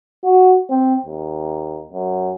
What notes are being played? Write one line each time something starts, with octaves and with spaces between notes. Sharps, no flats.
F#4
C4
D#2
F#2